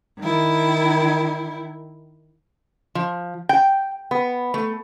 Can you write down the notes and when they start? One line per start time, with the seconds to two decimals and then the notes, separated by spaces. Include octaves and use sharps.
0.19 D#3 E4
2.95 F3
3.49 G5
4.11 B3
4.54 A3